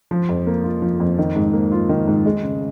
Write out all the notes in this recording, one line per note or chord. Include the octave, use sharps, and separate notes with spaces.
F3
F2
A#3
F4
F3
F2
D#3
G#2
A#3
F4
D#3
G#2
G#3
C#3